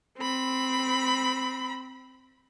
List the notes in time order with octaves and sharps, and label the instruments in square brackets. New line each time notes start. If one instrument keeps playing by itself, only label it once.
[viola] C4 B5